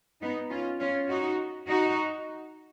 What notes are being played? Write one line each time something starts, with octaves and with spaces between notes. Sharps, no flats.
B3 D#4
C#4 F4
C#4 F4
D#4 F#4
D#4 F#4